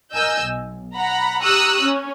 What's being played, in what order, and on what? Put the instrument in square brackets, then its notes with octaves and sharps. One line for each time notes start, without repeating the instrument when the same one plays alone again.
[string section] A#4 D#5 G#5 E6 G6
B1
F#5 A#5 B5
G4 A#5 C#6 D#6 E6 F#6
C#4